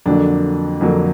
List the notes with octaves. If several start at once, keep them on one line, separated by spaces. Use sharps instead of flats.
F2 D3 F#3 A#3 D4
F2 D3 F#3 A#3